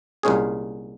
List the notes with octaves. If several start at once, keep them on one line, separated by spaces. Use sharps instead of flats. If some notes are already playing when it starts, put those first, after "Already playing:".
C2 A#2 G#3 C#4 G#4